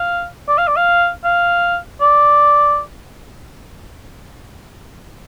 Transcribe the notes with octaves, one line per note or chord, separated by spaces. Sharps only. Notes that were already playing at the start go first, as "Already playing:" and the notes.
Already playing: F5
D5
F5
D5
F5
F5
D5